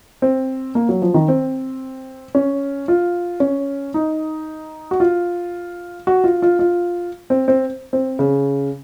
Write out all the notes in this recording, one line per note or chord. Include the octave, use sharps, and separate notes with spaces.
C4
A#3
F#3
F3
D#3
C4
C#4
F4
C#4
D#4
F#4
F4
F#4
F4
F4
F4
C4
C4
C4
C#3